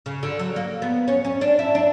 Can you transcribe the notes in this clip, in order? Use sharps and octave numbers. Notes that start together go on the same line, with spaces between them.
C#3
D3
F#3
A#3
B3
C#4
C#4
D4
E4
D4